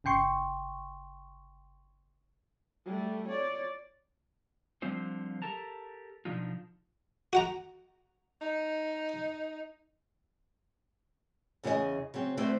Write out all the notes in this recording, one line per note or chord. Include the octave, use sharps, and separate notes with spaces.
G1 C#3 G5 C6 C#6
G3 A3
C#5 D5
D3 F3 G3 C4 F4 C5
G4 A4 A#4 A5 A#5
B2 D3 F3 D4 D#4 F4
F#4 F#5 A#5
D#4
E2 C#3 G4 G#4 D#5 G#5
C#3 F#3 C4
D3 A3 C4 E4 B4 C5